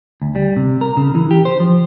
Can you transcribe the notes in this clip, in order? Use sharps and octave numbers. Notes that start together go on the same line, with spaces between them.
D2
G3
C3
A#4
C#3
E3
G4
C5
F3